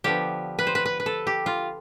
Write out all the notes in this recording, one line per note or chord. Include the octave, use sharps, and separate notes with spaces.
D3 F3 B3 G4
B4
C5
B4
B4
B4
A4
G4
F4